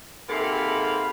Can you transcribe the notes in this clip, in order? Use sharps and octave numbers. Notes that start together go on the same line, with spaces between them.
G#2 C3 A#3 A4 F5 B5